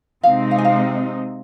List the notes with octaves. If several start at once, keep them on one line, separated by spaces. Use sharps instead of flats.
C3 G#3 C4 D#4 F5
F5
G#5
F5